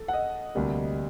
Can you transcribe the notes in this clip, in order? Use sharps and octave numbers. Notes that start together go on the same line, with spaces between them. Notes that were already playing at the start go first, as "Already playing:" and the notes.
Already playing: A4
F#5
D#5
D2 C3 G3 A#3